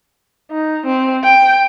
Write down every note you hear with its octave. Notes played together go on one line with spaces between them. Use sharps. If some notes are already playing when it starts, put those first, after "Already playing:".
D#4
C4
G5